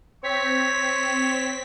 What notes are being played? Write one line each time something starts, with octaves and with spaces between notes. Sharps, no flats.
C4 C#5 B6